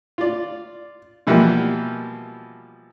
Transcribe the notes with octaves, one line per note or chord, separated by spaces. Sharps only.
F4 D5
B2 E3 F3 G3 A#3